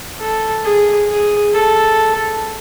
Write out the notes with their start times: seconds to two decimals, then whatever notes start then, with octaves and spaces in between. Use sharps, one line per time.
0.19 A4
0.64 G#4
1.08 G#4
1.53 A4